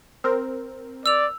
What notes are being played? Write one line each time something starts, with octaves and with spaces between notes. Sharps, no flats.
C4 A#4
D5 E6 F7